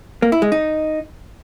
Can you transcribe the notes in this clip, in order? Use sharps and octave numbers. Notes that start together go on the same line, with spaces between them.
A#3
E4
G#3
D#4